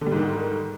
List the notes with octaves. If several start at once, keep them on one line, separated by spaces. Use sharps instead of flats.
G#2 D3 D#3 G3